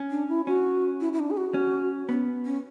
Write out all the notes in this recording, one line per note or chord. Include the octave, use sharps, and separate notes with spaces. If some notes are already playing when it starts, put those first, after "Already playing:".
Already playing: C#4
D4
E4
C#4 F#4
E4
E4
D4
G#4
F#4
C#4
B3 C#4
C#4